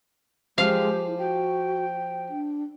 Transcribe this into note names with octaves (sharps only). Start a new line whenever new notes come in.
F3 G#3 G4 F5
E4
F#4 G5
D4